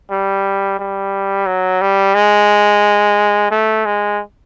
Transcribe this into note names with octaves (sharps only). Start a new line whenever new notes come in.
G3
G3
F#3
G3
G#3
A3
G#3